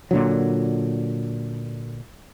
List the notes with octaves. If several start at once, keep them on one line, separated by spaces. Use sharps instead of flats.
A#2 D3 F#3